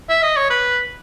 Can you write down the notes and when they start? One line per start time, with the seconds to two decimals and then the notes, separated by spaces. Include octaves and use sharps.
0.09 E5
0.23 D#5
0.37 C#5
0.50 B4